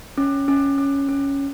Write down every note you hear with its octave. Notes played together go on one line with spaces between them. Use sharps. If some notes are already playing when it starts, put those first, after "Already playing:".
C#4
C#4
C#4
C#4